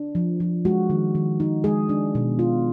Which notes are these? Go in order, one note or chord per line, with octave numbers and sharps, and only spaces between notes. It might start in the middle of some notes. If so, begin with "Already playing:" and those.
Already playing: D4
F3
F3
G#3 F#4
D#3
D#3
D#4
G#3 G#4
D4
B2
F4